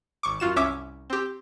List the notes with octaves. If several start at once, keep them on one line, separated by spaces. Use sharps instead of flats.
G#1 C#6 D6
F#2 F4 F#4 E7
C2 C#4 E5 D6
C4 G4